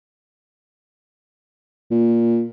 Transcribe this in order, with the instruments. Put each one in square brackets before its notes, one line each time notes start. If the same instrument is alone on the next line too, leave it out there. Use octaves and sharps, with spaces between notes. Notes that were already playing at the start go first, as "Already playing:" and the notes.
[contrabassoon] A#2